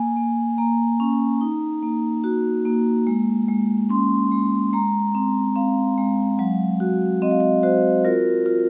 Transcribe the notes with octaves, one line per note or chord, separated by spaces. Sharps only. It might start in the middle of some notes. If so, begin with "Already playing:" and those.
Already playing: A#3 G#5
A#3
A#3 A#5
C#4
D#4
A#3
F#4
A#3
G#3
G#3
C#4 C6
G#3
G#3 A#5
C4
C4 F5
G#3
F#3
F#4
C4 D#5
F5
D#5
F#4 C5
F4 A#4
F4